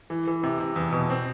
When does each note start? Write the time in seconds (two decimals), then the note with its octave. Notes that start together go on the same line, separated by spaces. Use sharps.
0.10 E3
0.27 E3
0.43 C3
0.60 C3
0.76 E2
0.92 B2
1.10 C4